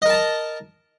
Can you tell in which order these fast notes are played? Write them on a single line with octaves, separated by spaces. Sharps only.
D#5 A#4 A5 A#5